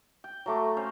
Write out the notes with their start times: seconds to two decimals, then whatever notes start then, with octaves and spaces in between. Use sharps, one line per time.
0.24 G5
0.46 F#3 A3 D6
0.77 C#4 C5 F5